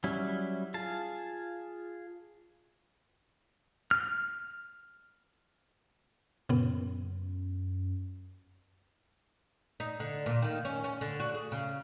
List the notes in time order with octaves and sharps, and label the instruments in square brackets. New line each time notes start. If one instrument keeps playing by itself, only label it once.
[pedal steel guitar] F#3 G3 C#4 E4
F4 G#4 A5
F6
[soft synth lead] F#2 [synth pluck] A#2 C#3 B3
[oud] D#4
D3
A#2
D#3
C#4
C#4
D3
F#4
G#4
C#3